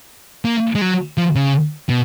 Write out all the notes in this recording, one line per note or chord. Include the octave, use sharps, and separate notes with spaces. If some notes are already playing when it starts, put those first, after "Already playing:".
A#3
G#3
F#3
F3
C#3
B2